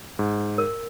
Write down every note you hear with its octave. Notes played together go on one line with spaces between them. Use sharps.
G#2
A#4